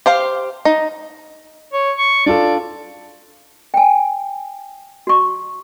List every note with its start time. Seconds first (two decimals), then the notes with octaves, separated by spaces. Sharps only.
0.06 G4 C5 F5
0.65 D#4
1.73 C#5
1.98 C#6
2.26 D4 F4 A4 D5
3.74 G5 G#5
5.07 F#4 C#6